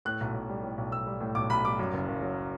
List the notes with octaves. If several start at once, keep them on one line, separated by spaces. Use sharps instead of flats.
A2 F#6
B1
B1
G3
A2
B1
B1 E6
G3
A2
B1 D6
B1 B5
G3 D6
F#2
F#1
F#1
F#3